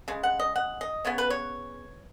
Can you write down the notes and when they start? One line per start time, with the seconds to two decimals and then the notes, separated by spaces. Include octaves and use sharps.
0.08 C#3 G#3
0.23 F#5
0.39 D#5
0.56 F#5
0.81 D#5
1.05 C#3 B3 C#5
1.18 B4
1.30 C#5